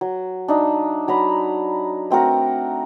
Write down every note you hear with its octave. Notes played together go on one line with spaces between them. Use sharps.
F#3
D4 D#4 E5
F#3 A#5 B5
A3 C4 F#4 A#4